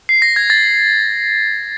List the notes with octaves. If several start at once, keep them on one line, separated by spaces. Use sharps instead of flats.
C7
A#6
G#6
A6